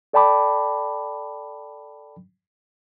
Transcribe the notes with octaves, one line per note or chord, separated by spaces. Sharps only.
A4 D5 G5 A5 B5 D6